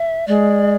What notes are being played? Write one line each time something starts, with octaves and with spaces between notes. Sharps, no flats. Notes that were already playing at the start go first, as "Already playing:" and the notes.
Already playing: E5
G#3 D5